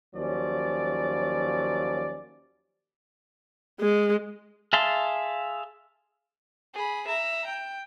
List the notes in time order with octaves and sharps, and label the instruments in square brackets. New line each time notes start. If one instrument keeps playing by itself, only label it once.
[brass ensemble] D#2 F3 F#3 C#4 D5
[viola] G#3
[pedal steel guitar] G#4 E5 F5 A5 C6
[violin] G#4 B5
E5 A#5
G5